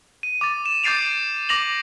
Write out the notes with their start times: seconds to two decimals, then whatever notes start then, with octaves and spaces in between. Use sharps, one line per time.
0.23 D#7
0.41 D6 A6
0.66 E7
0.84 D6 G6 A6 C7 D7 F7
1.49 D6 A#6 F7 F#7